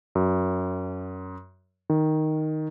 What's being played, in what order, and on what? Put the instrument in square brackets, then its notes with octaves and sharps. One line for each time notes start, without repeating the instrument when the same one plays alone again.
[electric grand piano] F#2
D#3